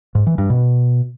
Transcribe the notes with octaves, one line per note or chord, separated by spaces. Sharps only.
G#2
E3
G2
B2